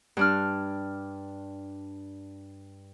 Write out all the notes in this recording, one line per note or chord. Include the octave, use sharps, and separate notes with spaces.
G2 D4 F6